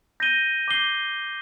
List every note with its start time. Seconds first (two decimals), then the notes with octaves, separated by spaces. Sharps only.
0.20 G6 A#6 D#7 G7
0.68 D6 G6 C7 G7